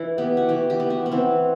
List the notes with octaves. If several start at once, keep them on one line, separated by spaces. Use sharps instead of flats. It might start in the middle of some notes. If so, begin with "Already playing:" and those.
Already playing: E3 E4
B3 G4
F#4
E3 G4
G4
B3
F#4
B3
E3 C4